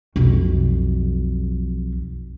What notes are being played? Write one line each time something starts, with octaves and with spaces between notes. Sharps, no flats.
B1 F2